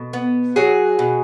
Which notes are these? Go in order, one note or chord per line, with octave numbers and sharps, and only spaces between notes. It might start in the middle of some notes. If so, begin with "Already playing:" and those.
Already playing: B2 A4
B3
F#3 F#4 G#4
B2